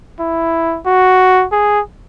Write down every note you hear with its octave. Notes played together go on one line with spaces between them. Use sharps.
E4
F#4
G#4